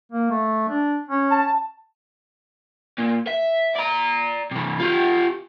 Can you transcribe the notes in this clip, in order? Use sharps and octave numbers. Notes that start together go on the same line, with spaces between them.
A#3
A3
D4
C#4
A5
A#2
E5
D5 A#5
C3 E3
F4 G4